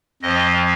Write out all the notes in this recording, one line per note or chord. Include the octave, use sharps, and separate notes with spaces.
F2 F3 D#5